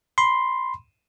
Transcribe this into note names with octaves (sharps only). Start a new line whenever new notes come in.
B5 C6